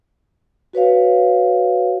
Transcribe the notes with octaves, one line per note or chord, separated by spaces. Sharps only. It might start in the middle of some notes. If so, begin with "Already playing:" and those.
F#4 B4 C#5 F5